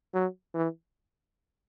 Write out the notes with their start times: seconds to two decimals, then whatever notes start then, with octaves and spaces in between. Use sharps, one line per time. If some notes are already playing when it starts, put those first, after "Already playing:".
0.14 F#3
0.55 E3